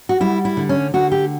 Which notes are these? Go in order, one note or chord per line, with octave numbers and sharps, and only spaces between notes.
F#4
G3 E4
E4
D3
C#4
D3 F#4
G4